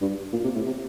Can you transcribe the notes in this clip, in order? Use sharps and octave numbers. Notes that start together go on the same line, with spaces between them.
G2
A#2
C3
A2
C3